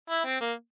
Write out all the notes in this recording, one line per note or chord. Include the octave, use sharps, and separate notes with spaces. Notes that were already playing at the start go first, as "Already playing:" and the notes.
E4
C4
A#3